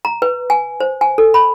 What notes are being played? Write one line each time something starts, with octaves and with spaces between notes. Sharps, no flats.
A#5
B4
G#5
C5
G#5
A4
B5